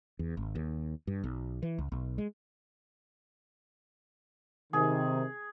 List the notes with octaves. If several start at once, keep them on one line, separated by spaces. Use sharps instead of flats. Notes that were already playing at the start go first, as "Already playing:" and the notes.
E2
G#1
D#2
G2
B1
E3
C#2
B1
G#3
C3 D#3 G#4